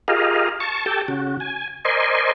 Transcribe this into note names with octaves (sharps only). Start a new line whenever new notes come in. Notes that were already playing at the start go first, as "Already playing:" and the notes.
F4 G4 G#4 A#4 D#5 F5
A5 C#6
G4 A4 G5 A5
C#3 F#4
G#5
A#4 C5 D5 D#5 G#5 C6